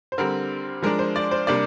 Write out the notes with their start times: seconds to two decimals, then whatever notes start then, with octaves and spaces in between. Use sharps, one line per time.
0.12 C5
0.18 D3 G3 C4 A#4
0.82 F3 G#3 D4 A#4
0.99 C5
1.16 D5
1.31 C5
1.47 C3 G3 A#3 D4 D5